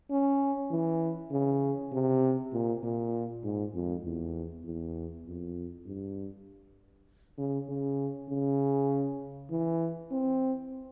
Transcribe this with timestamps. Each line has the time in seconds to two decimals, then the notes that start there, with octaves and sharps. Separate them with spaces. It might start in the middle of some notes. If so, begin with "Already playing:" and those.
0.10 C#4
0.71 E3
1.31 C#3
1.92 C3
2.52 A#2
2.83 A#2
3.44 G#2
3.74 F2
4.05 E2
4.65 E2
5.26 F2
5.86 G2
7.38 C#3
7.69 C#3
8.29 C#3
9.51 E3
10.11 C4